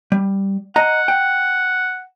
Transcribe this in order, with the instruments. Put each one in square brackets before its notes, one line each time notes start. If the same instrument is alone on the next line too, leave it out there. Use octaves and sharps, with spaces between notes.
[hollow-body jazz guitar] G3
[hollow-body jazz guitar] D#5 A#5 [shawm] F#5
[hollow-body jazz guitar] G5